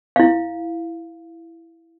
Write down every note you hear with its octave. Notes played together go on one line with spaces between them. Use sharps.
E4 F5